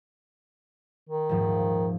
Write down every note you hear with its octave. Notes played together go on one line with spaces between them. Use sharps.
D#3
D#1 G#2 F3